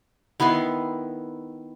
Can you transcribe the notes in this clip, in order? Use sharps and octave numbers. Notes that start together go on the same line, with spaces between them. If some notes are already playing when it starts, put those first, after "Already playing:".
D#3 B3 E4 C6